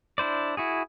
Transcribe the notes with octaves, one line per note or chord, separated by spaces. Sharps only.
D4 E4 C5 D5
E4 F#4 G#4